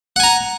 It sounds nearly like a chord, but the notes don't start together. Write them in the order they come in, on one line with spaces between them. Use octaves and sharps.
F#5 G#5 A#5